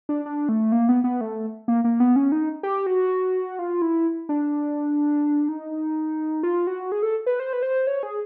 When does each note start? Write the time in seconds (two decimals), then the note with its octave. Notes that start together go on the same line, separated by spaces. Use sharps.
0.09 D4
0.26 D4
0.49 A3
0.72 A#3
0.89 B3
1.04 B3
1.21 A3
1.68 A#3
1.84 A#3
2.00 B3
2.16 C#4
2.32 D#4
2.63 G4
2.87 F#4
3.59 F4
3.82 E4
4.29 D4
5.49 D#4
6.43 F4
6.67 F#4
6.92 G#4
7.03 A4
7.26 B4
7.40 C5
7.53 B4
7.63 C5
7.87 C#5
8.03 G#4